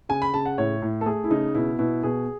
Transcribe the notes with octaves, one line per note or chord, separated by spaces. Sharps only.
C#3 G#5
B5
C#3 A5
F#5
A2 C#5
A2
A4
A3 G#4
E4
C#3 D#4
B2 E4
B2 E4
B2 G#4